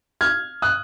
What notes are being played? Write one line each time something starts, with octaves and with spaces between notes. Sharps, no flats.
F6 G#6
D#6 F#6